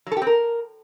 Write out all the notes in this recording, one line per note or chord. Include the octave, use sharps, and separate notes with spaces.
F#3
A4
G4
C4
A#4